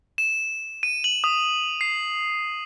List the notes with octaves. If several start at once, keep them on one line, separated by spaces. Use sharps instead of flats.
E7
D#7
F#7
D#6
C7